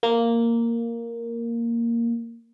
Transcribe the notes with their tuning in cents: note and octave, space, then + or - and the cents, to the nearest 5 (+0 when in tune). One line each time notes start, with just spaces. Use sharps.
A#3 -5